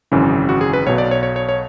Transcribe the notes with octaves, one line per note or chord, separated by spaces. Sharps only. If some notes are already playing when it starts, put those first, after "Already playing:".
G#1 F#2 C#3 E3
F#4
G#4
B4
B1 B2 C#5
D5
C#5
C#5
C#5
C#5